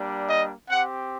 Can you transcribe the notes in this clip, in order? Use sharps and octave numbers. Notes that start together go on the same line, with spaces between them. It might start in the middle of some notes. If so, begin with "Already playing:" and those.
Already playing: G3 A#3 D4
D#5
C4 G4 F#5